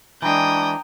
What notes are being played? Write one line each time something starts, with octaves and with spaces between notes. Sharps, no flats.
E3 G#3 D4 G5 A#5 D#6